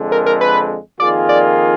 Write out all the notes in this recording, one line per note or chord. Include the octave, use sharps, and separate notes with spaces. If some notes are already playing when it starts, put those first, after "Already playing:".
Already playing: F2 D3 G#3
A#4
A#4
B4
F2 D#3 A#3 F4 G#4 D5
D5